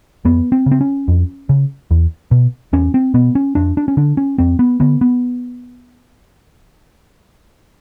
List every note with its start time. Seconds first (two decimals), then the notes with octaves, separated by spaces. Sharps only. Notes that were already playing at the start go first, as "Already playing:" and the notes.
0.25 F2 B3
0.52 C4
0.66 C#3
0.71 C4
0.81 C#4
1.08 F2
1.49 C#3
1.91 E2
2.31 B2
2.73 E2 C#4
2.94 C4
3.14 B2 B3
3.35 C#4
3.55 F2 D4
3.77 D4
3.88 C#4
3.97 D3 D4
4.17 C#4
4.38 F2 C4
4.59 B3
4.80 D3 B3
5.01 B3